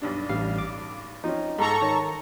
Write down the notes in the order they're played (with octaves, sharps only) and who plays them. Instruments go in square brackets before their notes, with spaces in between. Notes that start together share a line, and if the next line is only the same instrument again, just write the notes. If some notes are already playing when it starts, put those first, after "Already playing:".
[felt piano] B1 G2 D4
[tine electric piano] A1 G3 F5
D6
[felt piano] F3 C4 C#4 [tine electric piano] D#4
[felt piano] G#2 [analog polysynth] A4 A#5 C#6
[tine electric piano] D#3 [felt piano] C#5